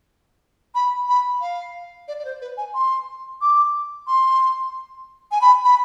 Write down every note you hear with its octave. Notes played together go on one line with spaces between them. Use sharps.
B5
B5
F5
D5
D5
C5
B4
G#5
C6
D6
C6
G#5
B5
B5